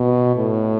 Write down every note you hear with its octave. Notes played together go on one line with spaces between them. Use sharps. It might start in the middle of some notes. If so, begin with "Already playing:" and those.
Already playing: B2
A2